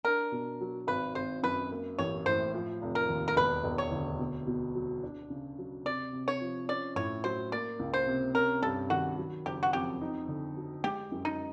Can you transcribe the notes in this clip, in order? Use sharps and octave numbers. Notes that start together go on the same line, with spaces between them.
D4 A#4
B2
F#3
G#1 B4
G#1 C5
F#2 B4
A#3
A1 C#5
A2 C5
F3
F1
A#4
D#2
A#4
E1 B4
E1
C#5
D2
B2
B2
F#3
D4
C#3
F#3
C3 D5
C3
C#5
F3
C#4 D5
A2 C#5
F#3 C5
A#3 D5
C#2
C5
C3
C#4 A#4
G2 A4
D#3 F#4
F#3
F#1 G4
F#4
F2 G4
D#4
D3
F#3
G#3 G4
F#2
D#4